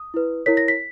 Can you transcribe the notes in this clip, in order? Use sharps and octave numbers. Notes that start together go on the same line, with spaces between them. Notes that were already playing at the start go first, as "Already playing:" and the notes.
Already playing: D#6
E4 B4
E4 A#4 C#5 B6
A#6
B6